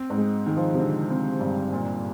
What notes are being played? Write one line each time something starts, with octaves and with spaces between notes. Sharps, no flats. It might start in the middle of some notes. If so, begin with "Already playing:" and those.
Already playing: C4
G#2
G#3
D#3 G#3
F3
C3
D3 C4
C4
G2
A#2